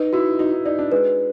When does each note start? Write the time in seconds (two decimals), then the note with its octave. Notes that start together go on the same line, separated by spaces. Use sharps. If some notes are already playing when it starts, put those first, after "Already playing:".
Already playing: D#4 B4
0.13 E4 F#4
0.39 D#4 F#4
0.53 D#4
0.65 D#4 D5
0.79 D4
0.92 G#3 B4